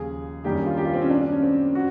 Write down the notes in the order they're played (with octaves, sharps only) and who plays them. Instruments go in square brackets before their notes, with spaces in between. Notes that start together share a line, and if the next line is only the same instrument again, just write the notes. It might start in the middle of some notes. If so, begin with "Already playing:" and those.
Already playing: [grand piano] D#2 C#3 F3 [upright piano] G#4
[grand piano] F#2 D#3 G3 A#3 D4 [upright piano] G4
[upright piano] F4
G4
F4
C4
C#4
D4
D4
C#4
C4
[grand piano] F#4